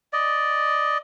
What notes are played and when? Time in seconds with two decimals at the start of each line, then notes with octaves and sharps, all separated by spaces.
0.13 D5 D#5